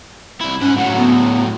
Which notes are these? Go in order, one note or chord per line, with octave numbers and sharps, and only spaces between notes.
C2 E4
G#2 C#4 F#5
A2 F#3 F#5
B3